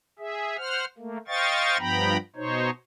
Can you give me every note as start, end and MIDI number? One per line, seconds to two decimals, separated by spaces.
0.19 0.57 68
0.19 0.57 76
0.58 0.85 72
0.58 0.85 78
0.58 0.85 89
0.98 1.18 57
0.98 1.18 58
1.28 1.77 72
1.28 1.77 75
1.28 1.77 77
1.28 1.77 79
1.28 1.77 85
1.28 1.77 93
1.79 2.17 43
1.79 2.17 53
1.79 2.17 59
1.79 2.17 79
1.79 2.17 82
1.79 2.17 83
2.36 2.70 47
2.36 2.70 63
2.36 2.70 72
2.36 2.70 73